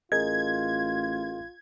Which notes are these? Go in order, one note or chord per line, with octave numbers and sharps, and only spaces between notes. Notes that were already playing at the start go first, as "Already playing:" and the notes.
A1 F4 G#4 A#4 D#5 G#6